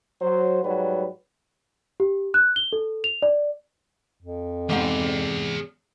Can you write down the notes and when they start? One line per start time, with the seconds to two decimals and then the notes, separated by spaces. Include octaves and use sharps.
0.20 F#3 C5
0.63 G#2 F#3 G3 B4
2.00 G4
2.34 F#6
2.56 G7
2.73 A4
3.04 F7
3.22 D5
4.22 F2
4.70 E2 G#2 C3 G#4 D5